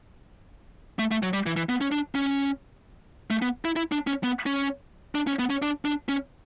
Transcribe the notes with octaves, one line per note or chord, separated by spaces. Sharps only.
A3
A3
F#3
G3
E3
E3
B3
C#4
D4
C#4
A3
B3
E4
E4
D4
C#4
B3
C#4
D4
C#4
B3
C#4
D4
D4
C#4